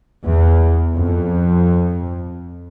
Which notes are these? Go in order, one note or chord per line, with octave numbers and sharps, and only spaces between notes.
E2
F2